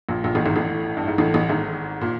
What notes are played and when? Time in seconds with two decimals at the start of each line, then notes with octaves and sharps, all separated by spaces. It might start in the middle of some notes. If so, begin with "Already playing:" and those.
0.09 A#1 A#2
0.24 A#1 A#2
0.35 A1 A2
0.45 G#1 G#2
0.56 A1 A2
0.97 G2
1.07 G#2
1.18 A1 A2
1.34 A1 A2
1.49 G#1 G#2
2.01 A#2